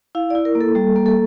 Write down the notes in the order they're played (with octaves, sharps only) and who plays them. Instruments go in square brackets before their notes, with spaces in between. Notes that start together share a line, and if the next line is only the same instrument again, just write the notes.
[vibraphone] E4 F5
E4 D5
A#4
A#3
A4
G3 A4
A#3
A4